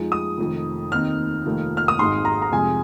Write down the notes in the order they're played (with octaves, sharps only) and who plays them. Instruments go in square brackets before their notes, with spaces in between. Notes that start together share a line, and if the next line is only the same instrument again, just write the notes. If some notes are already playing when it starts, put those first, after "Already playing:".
Already playing: [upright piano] F2 F3 G#3 D#4
D#6
F1 F2 D#3
D#2 D#3 C4 D#4 F6
F1 F2 D#3 A#3
F6
D#6
G#1 G#2 G#3 D#4 C6
A#5
A#5
F2 C3 F3 G#3 G#5